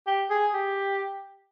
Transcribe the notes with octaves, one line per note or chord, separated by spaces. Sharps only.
G4
G#4
G4